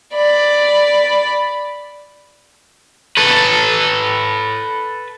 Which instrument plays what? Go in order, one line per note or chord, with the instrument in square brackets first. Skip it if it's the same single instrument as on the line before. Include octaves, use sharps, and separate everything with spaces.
[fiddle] D5 B5
[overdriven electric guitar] A4 B4